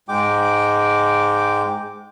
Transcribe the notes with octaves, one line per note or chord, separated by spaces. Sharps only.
G#2 G#3 G5 D6